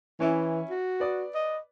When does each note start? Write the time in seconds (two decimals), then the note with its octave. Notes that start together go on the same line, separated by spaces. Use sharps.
0.20 E3 C#4 E4
0.70 F#4
1.00 B4 D5 D#6
1.34 D#5